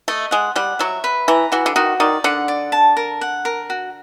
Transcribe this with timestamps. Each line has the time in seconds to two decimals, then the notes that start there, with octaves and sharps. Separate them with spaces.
0.08 A3 D#5
0.31 G#3 F#5
0.56 G3 F#5
0.79 F#3 E5
1.04 B4
1.28 E3 A#5
1.52 E3 F#4
1.66 D3
1.76 D#3 F#4
2.00 D#3 D5
2.24 D3 F#5
2.48 D5
2.72 A5
2.97 A#4
3.21 F#5
3.45 A#4
3.70 F#4